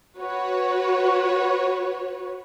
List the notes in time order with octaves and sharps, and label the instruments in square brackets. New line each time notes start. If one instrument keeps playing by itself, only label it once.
[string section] F#4 B4 C#5